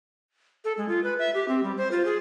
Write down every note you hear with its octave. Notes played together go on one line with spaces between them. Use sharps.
A4
G#3
F4
B4
E5
G4
C4
G3
C5
F4
G#4